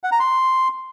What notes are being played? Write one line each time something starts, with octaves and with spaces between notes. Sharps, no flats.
F#5
A#5
C6